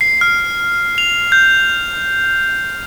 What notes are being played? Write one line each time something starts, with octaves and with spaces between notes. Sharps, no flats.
C7
F6
F7
G6